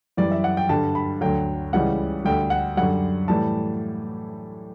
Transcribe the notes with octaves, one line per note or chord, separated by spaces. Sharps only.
F#2 E3 G3 D5
E5
F#5
G5
G2 D3 G3 A5
B5
D2 D3 F#3 G5
C#2 C#3 E3 G3 F#5
D2 D3 G3 G5
F#5
F#2 D3 G3 F#5
A2 E3 G3 A5